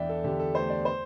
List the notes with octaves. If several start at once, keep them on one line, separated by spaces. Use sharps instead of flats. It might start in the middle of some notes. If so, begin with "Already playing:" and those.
Already playing: E2 D4 D5 E5 G5
A4
D3 G4
A4
A3 C5
D5
C5